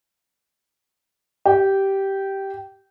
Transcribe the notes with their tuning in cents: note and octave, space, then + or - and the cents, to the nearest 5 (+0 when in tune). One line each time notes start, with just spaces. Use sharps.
G4 -10